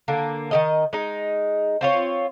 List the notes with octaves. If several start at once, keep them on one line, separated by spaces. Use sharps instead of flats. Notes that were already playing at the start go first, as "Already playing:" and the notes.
D3 A#3
D#3 F#3 D#5
G#3 D#4
C4 F4 C#5